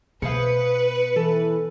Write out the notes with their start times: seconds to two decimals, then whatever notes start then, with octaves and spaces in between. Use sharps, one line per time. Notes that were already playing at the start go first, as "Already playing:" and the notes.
0.22 B2 G#4 B4 C5 F5 C#7
1.16 E3 A4